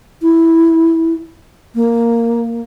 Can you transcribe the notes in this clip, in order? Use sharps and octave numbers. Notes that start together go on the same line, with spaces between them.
E4
A#3